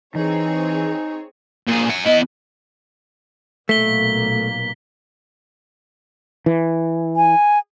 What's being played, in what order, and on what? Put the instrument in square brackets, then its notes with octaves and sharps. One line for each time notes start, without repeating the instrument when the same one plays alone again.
[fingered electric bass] E3 [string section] C4 G#4 C#5 [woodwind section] D#4
[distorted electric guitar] A#2 G#4
F#5 G#5
[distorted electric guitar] B3 E4 [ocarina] D#5
[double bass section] B1 A#2 A#3 [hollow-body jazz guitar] A3 [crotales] B6 G7
[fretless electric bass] E3
[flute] G#5